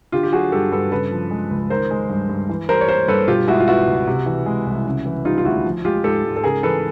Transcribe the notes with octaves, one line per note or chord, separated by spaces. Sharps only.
D3 F4 G4
G4
F#3 F#4 G#4
G2 G4 A4
G2 A4 B4
C#3 A4 B4
F3
G#3
C#2
D#3 A#4 C5
G#3
G2
G2
E3
G3 A#4 C5
C#5
A#3 A#4 C5
G2 A4 B4
B2 F4 G4
G#3 E4 F#4
F4
B3 E4 F#4
C#2
C3
E3
G#3
C2
C#3
E3
G3 D#4 F4
F4
D2 E4 F#4
F3
G#3 F4 G4
G#2 G4 A4
G#2
A4
C#3 G#4 A#4
E3 A4 B4